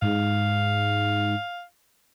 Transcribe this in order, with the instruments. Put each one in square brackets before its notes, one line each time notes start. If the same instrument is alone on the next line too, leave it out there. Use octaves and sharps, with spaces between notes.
[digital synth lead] G#2 [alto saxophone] F5